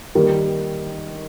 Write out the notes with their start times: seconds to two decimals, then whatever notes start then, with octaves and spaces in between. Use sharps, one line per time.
0.15 D#3 G3 A#3